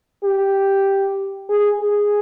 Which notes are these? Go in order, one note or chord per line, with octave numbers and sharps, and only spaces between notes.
G4
G#4
G#4